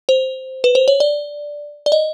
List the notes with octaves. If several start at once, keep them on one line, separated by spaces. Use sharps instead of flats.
C5
B4
C5
C#5
D5
D5
D#5